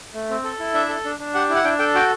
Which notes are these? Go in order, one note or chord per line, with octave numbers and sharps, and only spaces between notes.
A3
C4
A4
E4
D4 E5
A4
D4
D4
G4 F#5
E4
F#5
D4 G5
A4 G5
F#4 G5